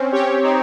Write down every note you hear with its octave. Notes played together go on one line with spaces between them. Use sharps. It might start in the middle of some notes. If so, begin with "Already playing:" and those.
Already playing: C4 C#4
G4 C#5
C4 D#4